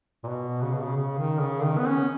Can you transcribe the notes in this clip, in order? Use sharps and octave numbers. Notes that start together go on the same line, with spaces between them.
A#2
B2
C#3
B2
C#3
C#3
D#3
C#3
D#3
B3
C#4